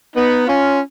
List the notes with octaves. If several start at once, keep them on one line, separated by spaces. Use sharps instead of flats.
B3 D#4
C#4 F4